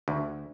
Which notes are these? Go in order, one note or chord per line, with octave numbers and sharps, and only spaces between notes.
D2